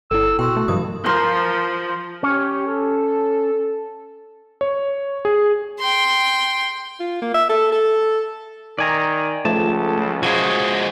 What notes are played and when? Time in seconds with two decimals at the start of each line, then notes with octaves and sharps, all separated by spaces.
0.11 G1 E4 A4 E6
0.39 B2 F#4 G5 C6 E6
0.57 A3
0.68 G2 E3 F#3 D#6
1.06 F3 A#4 C6
2.23 C#4 G4 C#5
2.67 A4
4.61 C#5
5.25 G#4
5.79 G5 C6
7.00 F4
7.22 A#3
7.34 E5
7.49 A4
7.73 A4
8.79 D#3 D5 G#5 A#5
9.45 C#2 F3 A3 A5
10.23 F3 G#3 F#4 G#6